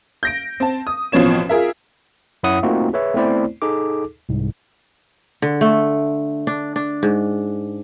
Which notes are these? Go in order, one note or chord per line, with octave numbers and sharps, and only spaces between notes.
G6 A#6 D7
C4 A5
D#6
A1 B2 F3 C4 C#5 E7
F4 G#4 A#4 E5
F#2 E4 C#5 F#5 D#6
A3 A#3 C4 D#4 F4 F#4
G#4 B4 C#5 E5
A3 B3 C4 E4 C5 D5
D#4 G#4 A4 D6
C2 G#2
D3
A3
D4
D4
G#2